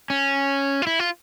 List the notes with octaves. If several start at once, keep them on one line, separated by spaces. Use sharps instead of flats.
C#4
F4
E4
F4